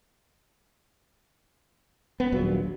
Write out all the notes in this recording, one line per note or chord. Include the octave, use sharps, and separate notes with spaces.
B3
D#1 A#1 A#2 F#3